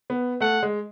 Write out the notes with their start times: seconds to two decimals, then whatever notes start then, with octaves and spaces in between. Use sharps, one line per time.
0.10 B3
0.41 A3 F#5
0.63 G#3